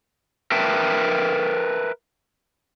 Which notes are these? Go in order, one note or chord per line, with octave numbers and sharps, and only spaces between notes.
A#4 B4 E5 G5 A5